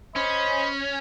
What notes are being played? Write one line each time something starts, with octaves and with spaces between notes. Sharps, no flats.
C#4 C5 D#5 B5